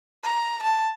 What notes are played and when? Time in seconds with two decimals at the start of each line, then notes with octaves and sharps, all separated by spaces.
0.23 A#5
0.63 A5